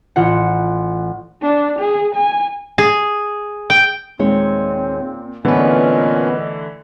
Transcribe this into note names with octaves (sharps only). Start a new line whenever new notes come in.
A1 F4 F#5
D4
G#4
G#5
G#4
G5
D#2 A#2 G#3 C4 C#5
A#2 D3 E3 A3 B3 C#4 B4 D#5